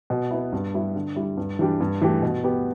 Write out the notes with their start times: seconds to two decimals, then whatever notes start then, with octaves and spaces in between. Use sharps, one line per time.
0.10 B2
0.31 B3 E4
0.53 G2
0.74 G3 E4 G4
0.96 D3
1.16 G3 E4
1.37 G2
1.59 E3 G3 D4 G4
1.80 G2
2.01 E3 A3 G4
2.22 B2
2.44 B3 G4